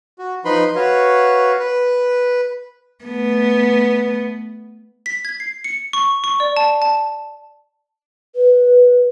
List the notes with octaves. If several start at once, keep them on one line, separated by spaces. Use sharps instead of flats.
F#4
F3 D#4 B4 B5 C6
F#4 B4 C#5 F5
B4
A3 B3
B6
G#6
C7
C#7
C#6
C#6
D5
A5
A5
B4